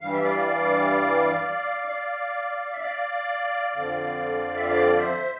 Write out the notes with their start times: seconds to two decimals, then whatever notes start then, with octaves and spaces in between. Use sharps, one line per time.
0.01 G2 E3 G3 F5
0.12 E5
0.24 D5 F5
1.87 D5 F5
2.73 E5
2.81 D5 F5
3.73 F2 D3 F3
4.56 E5
4.67 D5 F5
4.98 C5 E5